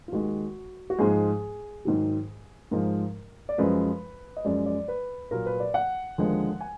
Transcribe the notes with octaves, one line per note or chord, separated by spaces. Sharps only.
F4
D#2 D#3 G#3 F#4
F#4
G#2 F3 G#3 G#4
G#2 D#3 F#3
G#2 F3 G#3 A#4
D5
F#2 F3 G#3 B4
D#5
F#2 F3 G#3 D5
D5
B4
A#2 F#3 A#4
B4
D5
F#5
D#2 D3 F3 G#3
G#5